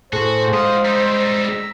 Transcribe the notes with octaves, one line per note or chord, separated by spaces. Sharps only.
A2 F#4 G#4 A4 C5
G#2 G#3 F4 F#5 D#6
G3 D#4 A#5 E6